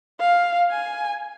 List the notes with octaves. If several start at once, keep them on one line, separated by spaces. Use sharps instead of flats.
F5
G#5